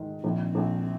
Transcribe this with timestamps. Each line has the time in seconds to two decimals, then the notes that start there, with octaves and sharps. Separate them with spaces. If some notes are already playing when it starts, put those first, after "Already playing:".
Already playing: G#2 D#3
0.24 A#1 C4
0.55 A#1